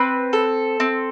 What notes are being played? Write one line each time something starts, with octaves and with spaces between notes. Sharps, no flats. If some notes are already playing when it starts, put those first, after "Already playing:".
Already playing: C4 B4
A4
C4